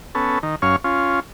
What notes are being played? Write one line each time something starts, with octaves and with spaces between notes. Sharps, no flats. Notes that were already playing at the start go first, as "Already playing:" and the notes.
B3 C#4 A4
D#3
F#2 C#4 C#5 F5
C#4 F4